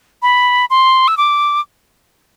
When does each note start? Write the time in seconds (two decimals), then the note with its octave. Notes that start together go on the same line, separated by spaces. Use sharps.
0.22 B5
0.70 C6
1.08 E6
1.17 D6